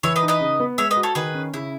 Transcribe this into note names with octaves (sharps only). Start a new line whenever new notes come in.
E3 C#5 E5
B4 D#5
D#4
B4 D#5
C#3
B3
G#3 C#5 E5
B4 D#5
F#4
A4 C#5
D#3 G#4 B4
C#4
C#3 E4